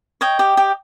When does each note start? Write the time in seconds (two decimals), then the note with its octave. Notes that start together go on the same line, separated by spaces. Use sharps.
0.21 C#5 D#5 G5
0.39 G4
0.57 G4